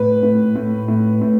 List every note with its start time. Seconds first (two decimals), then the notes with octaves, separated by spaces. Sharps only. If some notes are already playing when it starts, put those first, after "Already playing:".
Already playing: A2 B4
0.23 A2
0.55 A2
0.88 A2
1.21 A2